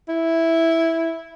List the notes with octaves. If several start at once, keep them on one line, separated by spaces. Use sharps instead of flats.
E4